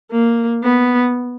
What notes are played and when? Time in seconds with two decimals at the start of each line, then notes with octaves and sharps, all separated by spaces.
0.11 A#3
0.63 B3